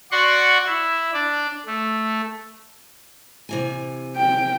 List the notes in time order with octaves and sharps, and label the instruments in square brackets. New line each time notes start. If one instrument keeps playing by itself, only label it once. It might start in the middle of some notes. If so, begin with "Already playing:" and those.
[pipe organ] F#4 D5 F#5 C6 C#6
E4
D4 D5
A3
[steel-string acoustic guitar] C3 E3 G#5
[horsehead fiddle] G5